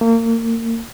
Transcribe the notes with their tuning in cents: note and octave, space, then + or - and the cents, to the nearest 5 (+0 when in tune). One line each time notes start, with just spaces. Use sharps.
A#3 -35